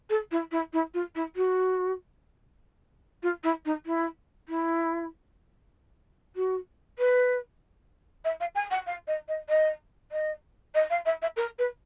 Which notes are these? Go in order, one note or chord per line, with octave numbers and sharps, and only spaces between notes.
A4
E4
E4
E4
F4
E4
F#4
F4
E4
D#4
E4
E4
F#4
B4
E5
F5
G#5
F#5
F5
D#5
D#5
D#5
D#5
D#5
F5
E5
E5
A#4
B4